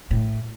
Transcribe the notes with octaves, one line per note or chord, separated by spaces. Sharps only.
A2